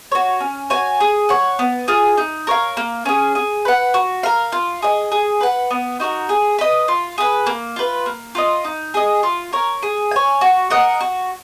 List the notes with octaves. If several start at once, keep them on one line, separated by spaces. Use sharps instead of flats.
F#4 C#5
C#4
F#4 C#5 G#5
G#4
C#5 F#5
B3
F4 G#4
D#4
A#4 C#5 F5
A#3
C#4 G#4
G#4
B4 F#5
F#4
A#4 F5
F4
G#4 D#5
G#4
B4 F#5
B3
D#4 F#4 A#4
G#4
B4 D#5
F4
G#4 B4
A#3
F4 B4
A#3
F4 B4 D#5
D#4
G#4 D#5
F4
A#4 C#5
G#4
C#5 G#5
F#4
A#4 D#5 F#5
F#4